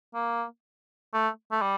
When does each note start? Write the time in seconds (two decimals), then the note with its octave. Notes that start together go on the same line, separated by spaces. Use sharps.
0.14 A#3
1.14 A3
1.52 A3
1.62 G3